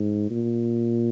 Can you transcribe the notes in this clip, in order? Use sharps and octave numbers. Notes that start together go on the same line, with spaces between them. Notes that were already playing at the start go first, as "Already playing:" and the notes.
Already playing: G#2
A#2